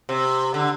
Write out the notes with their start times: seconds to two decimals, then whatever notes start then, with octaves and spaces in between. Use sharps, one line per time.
0.09 C3
0.54 D3